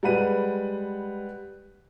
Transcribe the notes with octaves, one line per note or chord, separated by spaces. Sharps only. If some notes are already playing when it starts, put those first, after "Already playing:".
G3 G#3 B4 F#5 B5 D#7